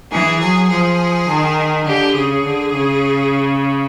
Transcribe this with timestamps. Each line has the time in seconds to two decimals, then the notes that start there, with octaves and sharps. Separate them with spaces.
0.11 E3 G#4
0.41 F#3 G#4
0.70 F3 G#4
1.28 D#3
1.86 D3 G4
2.15 C#3 G#4
2.44 D3
2.72 C#3